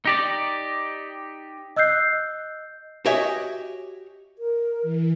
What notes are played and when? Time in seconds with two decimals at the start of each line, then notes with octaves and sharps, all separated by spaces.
0.05 D#4 G4 D5
1.76 D#5 E6 F#6 G6 C7
3.06 F#4 G4 C#5 D#5 E5 G#5
4.39 A#4
4.82 E3